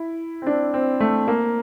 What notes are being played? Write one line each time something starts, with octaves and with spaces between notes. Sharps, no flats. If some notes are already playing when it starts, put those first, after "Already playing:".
Already playing: E4
C4
D4
C4
A3
A#3